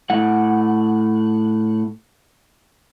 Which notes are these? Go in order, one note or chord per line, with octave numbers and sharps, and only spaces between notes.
A2 F#5